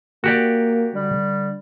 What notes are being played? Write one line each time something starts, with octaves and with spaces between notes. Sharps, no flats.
A#3 F#4 G4 D5
D3 G3